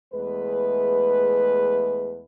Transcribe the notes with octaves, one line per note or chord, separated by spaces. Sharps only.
E2 G#3 A3 B4